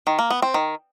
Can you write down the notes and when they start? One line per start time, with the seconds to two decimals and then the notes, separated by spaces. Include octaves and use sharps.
0.07 D#3
0.19 A#3
0.30 B3
0.42 C4
0.54 D#3